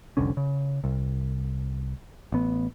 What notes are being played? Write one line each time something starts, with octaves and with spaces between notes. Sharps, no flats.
F1 C2 D3 C#4
C#3
C2
A1 B3